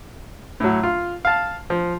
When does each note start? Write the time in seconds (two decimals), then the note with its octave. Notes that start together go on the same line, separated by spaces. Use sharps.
0.60 A2 F#3
0.83 F4
1.25 F5 A5
1.70 F3